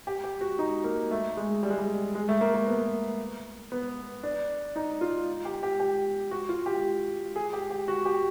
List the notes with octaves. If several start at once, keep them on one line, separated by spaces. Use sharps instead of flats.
G4
G4
F#4
D#4
A#3
A3
G#3
G3
G#3
G3
G#3
A3
A#3
A#3
B3
B3
D4
D#4
F4
G4
G4
G4
F#4
F4
G4
G#4
G4
G4
F#4
G4